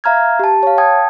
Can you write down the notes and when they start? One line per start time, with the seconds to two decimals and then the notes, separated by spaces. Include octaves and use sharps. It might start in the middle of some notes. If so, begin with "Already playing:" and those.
0.04 E5 F5 A#5 F6 G#6
0.39 G4 A5
0.63 C#5 F5
0.78 G5 A5 D#6 G#6